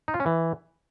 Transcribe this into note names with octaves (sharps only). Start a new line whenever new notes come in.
D#4
F4
C#4
E3